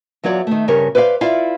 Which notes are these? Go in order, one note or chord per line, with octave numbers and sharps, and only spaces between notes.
E2 F#3 F4 C#5 D5
D#3 A3
G2 C#3 G4 A#4 C#5
B4 C5 D5 E5 F5
E4 F4 D5 F5